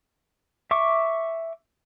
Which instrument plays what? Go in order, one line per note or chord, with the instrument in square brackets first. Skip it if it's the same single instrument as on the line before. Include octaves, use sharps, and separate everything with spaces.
[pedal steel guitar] E5 C#6 D6